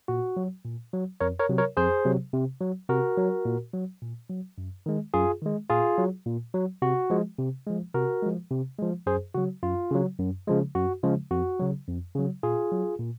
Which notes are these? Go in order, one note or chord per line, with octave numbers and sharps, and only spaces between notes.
A#2 F#4
F#3
A#2
F#3
F2 A#4 C#5
A#4 C#5
C3 F#3
A#4 C#5
F2 G#4 C5
C3 F#3
C3
F#3
C3 F#4 A#4
F#3
A#2
F#3
A#2
F#3
F#2
D#3 G#3
F#2 F4 G#4
D#3 G#3
A#2 F4 G#4
F#3
A#2
F#3
C3 F#4
F3 G#3
C3
F3 G#3
C3 F#4 A#4
F3 G#3
C3
F3 G#3
F#2 G#4 C5
C#3 F#3 F#4
F#2 F4
C#3 F#3
F#2
C#3 F3 G#3
F#2 F#4
C#3 F3 G#3
F2 F#4
C#3 F#3
F2
C#3 F#3
A#2 F4 G#4
F#3
A#2